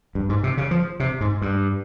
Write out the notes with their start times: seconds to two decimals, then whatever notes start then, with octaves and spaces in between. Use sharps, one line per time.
0.15 G2
0.29 G#2
0.43 C3
0.57 C#3
0.71 F3
1.00 C3
1.21 G#2
1.42 G2